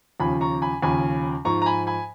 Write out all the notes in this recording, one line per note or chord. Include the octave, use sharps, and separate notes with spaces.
D#2 C#3 F3 G#5 B5
A#5 C#6
G#5 B5
D#2 C#3 F3 G#5 B5
G#2 F3 A#5 C#6
A#5
G#5 B5
G#5 B5